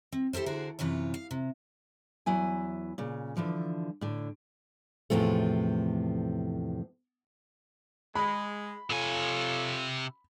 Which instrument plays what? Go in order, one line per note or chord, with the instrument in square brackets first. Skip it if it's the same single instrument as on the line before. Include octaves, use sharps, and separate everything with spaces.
[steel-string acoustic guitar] C4
E4 G4 A4 A#4 C5
D3 F#4 G#4 A#4 C5
F#2 C3 E3 F4 C#5
F5
C3
E2 F#3 E4 G#5
A#2 C#3
D3 E3 F3
A2 D3
[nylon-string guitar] E2 A2 C3 F3 A3
[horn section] G#3 [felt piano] B5
[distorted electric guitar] C3 G#5 [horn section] F4 A4 C#5